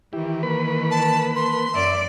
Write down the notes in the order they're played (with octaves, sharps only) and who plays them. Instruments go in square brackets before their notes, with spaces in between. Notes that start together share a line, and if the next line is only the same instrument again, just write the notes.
[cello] D#3 E3 [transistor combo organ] E4 G4
[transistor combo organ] A#3 B4 B5
[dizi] A5
C6
[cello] F#2 D5 [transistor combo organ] E5